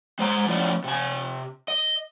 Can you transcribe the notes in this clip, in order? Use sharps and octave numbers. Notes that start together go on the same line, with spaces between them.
G#3 C5 A#5
F3 A3 C#4 E4 D5 D#5
C3 G#5
D#5